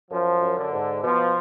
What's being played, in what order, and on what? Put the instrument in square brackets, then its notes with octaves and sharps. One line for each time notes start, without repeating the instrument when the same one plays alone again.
[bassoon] F#2 [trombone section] F3
[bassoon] F#2
[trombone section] D3
[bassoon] G#2
[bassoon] B2 [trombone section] F3